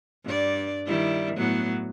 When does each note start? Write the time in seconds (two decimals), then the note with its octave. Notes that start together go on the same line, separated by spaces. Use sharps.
0.25 G2 G3 D5
0.86 D#3 G3 E4
1.35 A2 F#3 B3